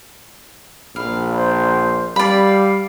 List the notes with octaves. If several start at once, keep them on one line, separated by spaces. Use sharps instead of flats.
A#1 F5 B5
C5
G3 D5 F5 B5